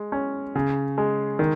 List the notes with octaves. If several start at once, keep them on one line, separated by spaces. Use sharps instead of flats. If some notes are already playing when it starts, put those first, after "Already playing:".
Already playing: G#3
C#4
C#3
G#3
D#3